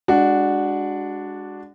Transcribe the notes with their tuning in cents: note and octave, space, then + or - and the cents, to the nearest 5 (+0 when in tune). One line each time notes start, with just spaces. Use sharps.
G#3 -25 D4 +0 F#4 +0